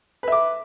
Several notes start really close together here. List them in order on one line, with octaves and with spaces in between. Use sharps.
B4 E5 D6